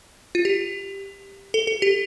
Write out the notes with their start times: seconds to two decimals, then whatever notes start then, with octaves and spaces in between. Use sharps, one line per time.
0.35 F4
0.45 G4
1.54 A4
1.67 A4
1.82 G4